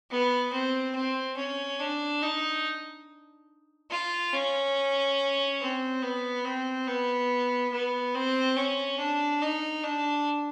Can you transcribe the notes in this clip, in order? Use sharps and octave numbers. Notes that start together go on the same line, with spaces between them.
B3
C4
C4
C#4
D4
D#4
F4
C#4
C4
B3
C4
B3
B3
C4
C#4
D4
D#4
D4